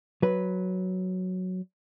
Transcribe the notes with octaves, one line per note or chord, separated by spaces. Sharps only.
F#3 B4